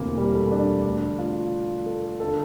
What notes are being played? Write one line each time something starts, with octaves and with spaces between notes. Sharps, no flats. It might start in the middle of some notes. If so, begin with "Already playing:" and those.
Already playing: E1 D2 C3 E3 A#3
G3
A3
D4
D2 D3
F4
A4
D3 A4